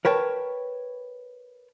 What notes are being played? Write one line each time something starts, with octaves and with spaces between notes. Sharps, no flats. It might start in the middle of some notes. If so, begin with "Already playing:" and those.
A#4 B4 C#5 G5 A5